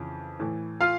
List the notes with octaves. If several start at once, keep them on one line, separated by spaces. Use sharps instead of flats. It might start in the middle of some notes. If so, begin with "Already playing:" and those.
Already playing: F2 C#3 E3
A2 E3
F4 F5